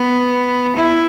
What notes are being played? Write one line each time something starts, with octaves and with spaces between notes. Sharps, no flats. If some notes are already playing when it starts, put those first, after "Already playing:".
Already playing: B3
E4